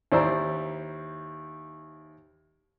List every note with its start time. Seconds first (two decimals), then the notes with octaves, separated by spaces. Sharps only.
0.12 D#2 E4 C5 D5 A#5 E6